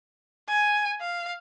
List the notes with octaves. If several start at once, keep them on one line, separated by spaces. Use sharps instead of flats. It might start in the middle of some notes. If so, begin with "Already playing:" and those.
G#5
F5